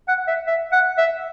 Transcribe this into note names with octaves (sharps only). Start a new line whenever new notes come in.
F#5
E5
E5
F#5
E5